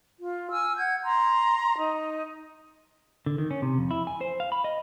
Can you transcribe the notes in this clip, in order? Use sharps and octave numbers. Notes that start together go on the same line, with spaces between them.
F4
G#5 E6 F6
F#5 G6 G#6
A#5 C6
D#4
D3
D#3
C#4
C3
F2
E4
G#5
C5
F5
B5
D#5